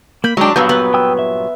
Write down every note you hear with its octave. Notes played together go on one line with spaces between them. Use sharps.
A#3 B5 G6
F#3 G#3 D4 G5
G2 A#2 F#3 B3 E6 G6
B3 B4
G5 D#6 E6
E5